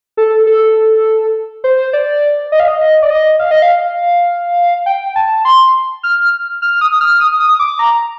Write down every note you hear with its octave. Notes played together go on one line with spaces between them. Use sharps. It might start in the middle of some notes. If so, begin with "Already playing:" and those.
A4
A4
C5
D5
D#5
F5
D#5
D5
D#5
F5
D#5
F5
G5
A5
C6
F6
F6
D#6
F6
D#6
D#6
D6
A#5